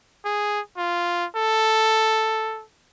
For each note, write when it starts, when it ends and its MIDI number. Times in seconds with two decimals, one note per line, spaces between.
0.25 0.60 68
0.77 1.25 65
1.36 2.63 69